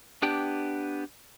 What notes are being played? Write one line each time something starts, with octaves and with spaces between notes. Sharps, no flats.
B3 D4 G4 G5